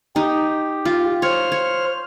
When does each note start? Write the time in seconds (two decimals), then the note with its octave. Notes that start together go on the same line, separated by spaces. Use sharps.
0.16 D#4 G4
0.85 F4
1.22 C5 C#5 F6
1.52 C#5